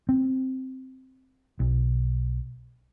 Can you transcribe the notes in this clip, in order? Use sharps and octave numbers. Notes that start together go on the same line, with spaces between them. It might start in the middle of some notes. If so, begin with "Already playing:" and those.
C4
B1